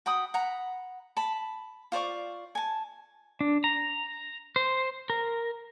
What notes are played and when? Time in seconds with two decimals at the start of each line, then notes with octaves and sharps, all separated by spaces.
0.06 F#4 G5 B5 D#6
0.34 F#5 A#5 B5
1.17 A5 B5
1.92 F4 C5 D5 C#6
2.55 G#5 A5
3.41 D4
3.64 A#5
4.56 C5
5.10 A#4